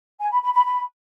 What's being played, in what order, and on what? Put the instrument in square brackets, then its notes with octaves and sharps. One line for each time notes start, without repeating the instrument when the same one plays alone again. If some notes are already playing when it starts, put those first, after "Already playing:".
[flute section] G#5
B5
B5
B5
B5